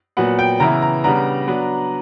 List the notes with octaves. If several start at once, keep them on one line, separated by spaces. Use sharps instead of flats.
A#2 F#3 B3 F#5
G5
C#3 E3 B3 E4 A#5
A#5
C#3 G3 B3 D4 A#5
F#3 B3 D4